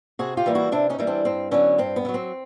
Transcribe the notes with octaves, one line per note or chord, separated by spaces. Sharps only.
C3 F#4 G#4
F4 G4
E3 G3 A#3
E4 F#4
C3 D4 E4
C#4 D#4
E3 G3 A#3
C4 D4
G2 C4
D3 F#3 B3 C#4
G2 C4
B3
D3
F#3
C4